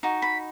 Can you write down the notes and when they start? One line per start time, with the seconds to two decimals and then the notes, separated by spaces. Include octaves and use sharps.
0.03 D#4 F#4
0.22 B5